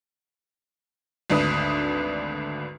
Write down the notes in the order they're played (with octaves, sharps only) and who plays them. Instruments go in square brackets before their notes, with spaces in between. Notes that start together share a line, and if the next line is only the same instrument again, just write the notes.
[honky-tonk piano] G#1 D2 D4 B4 D#6